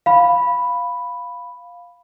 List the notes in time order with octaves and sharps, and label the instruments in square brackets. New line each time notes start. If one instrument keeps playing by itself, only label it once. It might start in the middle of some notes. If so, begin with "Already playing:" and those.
[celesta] F5 B5